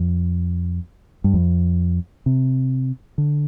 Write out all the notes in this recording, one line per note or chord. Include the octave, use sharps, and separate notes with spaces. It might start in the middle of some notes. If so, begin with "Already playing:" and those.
Already playing: F2
G2
F2
C3
D3